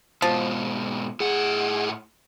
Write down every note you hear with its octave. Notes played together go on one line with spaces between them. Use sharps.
G#2 B2 F3
A2 G#4 F#5